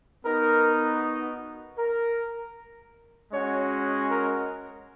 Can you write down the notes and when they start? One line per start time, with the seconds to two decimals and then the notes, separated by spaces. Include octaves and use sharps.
0.24 B3 D#4 F#4 A#4
1.78 A#4
3.32 G#3 C#4 F#4 C#5
4.10 A#4